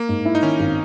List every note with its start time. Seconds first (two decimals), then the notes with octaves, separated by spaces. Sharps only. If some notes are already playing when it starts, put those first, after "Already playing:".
Already playing: A#3
0.09 G#2
0.25 E4
0.35 D#4
0.42 D#3 C#4
0.60 G#1